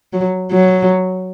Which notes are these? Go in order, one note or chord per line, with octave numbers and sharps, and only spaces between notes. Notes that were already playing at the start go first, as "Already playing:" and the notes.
F#3
F#3